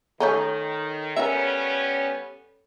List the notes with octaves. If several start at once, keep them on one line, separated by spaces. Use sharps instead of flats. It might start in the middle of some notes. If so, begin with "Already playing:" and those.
D#3 A3 C#4 D#4 A4 C#5 G6
G3 B3 C#4 A#4 E5